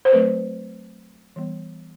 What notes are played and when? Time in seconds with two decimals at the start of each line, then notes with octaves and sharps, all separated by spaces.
0.05 C5
0.12 F#3 A3 C4 B4
1.36 E3 G3 B3